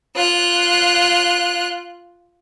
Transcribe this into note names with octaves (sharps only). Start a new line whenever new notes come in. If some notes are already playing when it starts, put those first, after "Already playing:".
F4 F#6